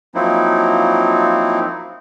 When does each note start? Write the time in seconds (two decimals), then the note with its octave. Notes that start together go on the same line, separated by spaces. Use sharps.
0.15 F3 F#3 A#3 C4 D#4 E4